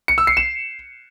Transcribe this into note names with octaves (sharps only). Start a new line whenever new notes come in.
C#7
E6
C7
E7